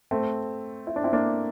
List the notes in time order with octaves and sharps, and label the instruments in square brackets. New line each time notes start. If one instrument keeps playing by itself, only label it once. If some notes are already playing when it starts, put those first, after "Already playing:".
[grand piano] A3 C4
E4
D4
C4 E4
A#3 D4